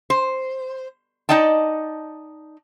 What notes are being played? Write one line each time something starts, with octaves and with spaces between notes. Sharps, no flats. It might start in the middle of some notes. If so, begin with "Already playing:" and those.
C5
D#4 D5 D#5 G5 A5